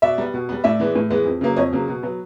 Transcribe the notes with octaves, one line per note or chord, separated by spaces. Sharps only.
B2 D5 E5
G3 B3
B2
G3 B3
A2 D5 E5
E3 G#3 B3
A2
E3 G#3 B3
F2
C#3 F#3 A#3
F2 C#5 D#5
C#3 F#3 A#3
B2
F#3 B3